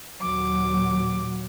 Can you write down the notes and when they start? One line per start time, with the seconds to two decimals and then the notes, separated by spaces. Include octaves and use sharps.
0.21 D#2 A#2 F#3 D6